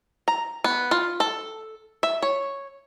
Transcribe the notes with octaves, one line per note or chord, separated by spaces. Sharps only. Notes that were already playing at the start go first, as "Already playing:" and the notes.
A#5
B3
F4
A4
E5
C#5